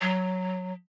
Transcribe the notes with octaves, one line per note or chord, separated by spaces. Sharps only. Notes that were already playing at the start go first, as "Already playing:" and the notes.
F#3